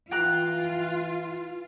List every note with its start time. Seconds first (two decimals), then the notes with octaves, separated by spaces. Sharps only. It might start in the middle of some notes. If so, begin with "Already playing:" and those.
0.11 E3 F4 G5 A#5 F#6